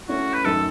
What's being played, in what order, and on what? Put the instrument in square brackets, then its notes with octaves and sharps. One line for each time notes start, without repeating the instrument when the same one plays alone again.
[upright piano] A3 C#4 E4 [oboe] F#4
[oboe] B4
[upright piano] F#2 D#3 A3 [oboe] A4